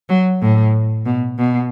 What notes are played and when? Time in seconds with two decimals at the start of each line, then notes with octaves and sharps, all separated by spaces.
0.09 F#3
0.41 A2
1.06 B2
1.38 B2